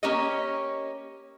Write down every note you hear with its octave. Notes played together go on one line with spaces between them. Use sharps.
A#3 C#4 G4 C#5 D#5